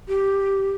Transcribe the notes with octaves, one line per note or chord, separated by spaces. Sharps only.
G4